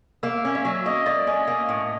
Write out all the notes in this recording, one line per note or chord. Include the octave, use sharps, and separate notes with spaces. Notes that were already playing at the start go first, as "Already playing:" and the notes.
A#3 E5
C#4
E5
F#3
A#3 D#5
A#3 D5
C#4 D#5
A#3
A2